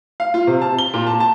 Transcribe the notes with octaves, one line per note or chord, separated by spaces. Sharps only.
F5
F4
C3
A5
G7
A#2
A5
A5